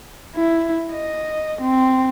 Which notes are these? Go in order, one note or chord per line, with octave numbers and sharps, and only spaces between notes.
E4
D#5
C4